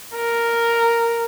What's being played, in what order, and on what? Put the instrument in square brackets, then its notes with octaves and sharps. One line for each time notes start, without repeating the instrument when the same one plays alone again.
[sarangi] A#4